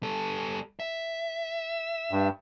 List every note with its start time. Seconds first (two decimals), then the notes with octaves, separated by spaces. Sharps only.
0.03 G3 A4
0.80 E5
2.11 G2